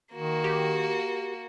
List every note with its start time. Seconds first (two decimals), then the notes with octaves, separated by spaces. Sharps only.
0.13 D#3 A#3 F#4
0.44 G4